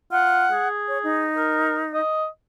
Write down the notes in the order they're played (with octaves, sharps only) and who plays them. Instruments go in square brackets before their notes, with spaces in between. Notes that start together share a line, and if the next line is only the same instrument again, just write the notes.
[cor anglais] F4 [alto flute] F#5
[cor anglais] G#4
[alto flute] C#5
D#4
[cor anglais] A#4
D#5